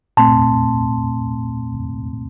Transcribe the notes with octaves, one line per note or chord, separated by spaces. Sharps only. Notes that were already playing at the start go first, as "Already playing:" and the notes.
A#2 A3 C4 A5 C6